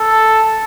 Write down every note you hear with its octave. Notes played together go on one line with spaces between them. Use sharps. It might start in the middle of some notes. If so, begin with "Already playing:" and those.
Already playing: A4